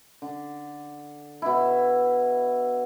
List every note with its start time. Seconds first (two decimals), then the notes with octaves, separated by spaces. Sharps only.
0.22 D3
1.42 B2 E4